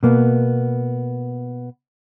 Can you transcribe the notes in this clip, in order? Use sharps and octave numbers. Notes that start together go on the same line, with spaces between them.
B2 A#3 B3